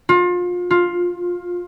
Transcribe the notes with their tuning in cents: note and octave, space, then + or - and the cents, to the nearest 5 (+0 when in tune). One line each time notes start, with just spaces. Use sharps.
F4 +30
F4 +10